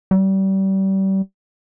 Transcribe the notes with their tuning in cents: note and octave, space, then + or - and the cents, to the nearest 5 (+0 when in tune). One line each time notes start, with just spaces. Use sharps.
G3 -30